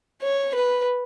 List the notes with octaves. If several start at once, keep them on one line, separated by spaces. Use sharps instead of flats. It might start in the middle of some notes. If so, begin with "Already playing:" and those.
C#5
B4